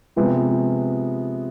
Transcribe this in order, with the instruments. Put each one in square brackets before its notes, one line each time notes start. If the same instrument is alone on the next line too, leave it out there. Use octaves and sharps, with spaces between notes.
[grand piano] C3 F3 G#3 B3